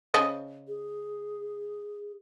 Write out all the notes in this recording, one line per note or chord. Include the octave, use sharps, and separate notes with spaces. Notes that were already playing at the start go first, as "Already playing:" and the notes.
C#3 C5 D#5
G#4